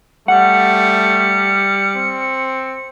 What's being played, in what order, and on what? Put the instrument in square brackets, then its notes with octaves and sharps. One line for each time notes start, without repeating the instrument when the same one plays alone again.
[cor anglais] G3 [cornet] A3 [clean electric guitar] F#5 [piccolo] C#7
[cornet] C4